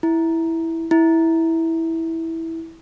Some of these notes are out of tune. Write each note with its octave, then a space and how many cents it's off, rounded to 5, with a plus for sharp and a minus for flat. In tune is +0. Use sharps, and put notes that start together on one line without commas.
E4 -5
E4 -10